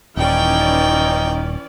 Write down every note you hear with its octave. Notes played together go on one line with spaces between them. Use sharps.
D#1 E3 C#4 D#4 D5 G5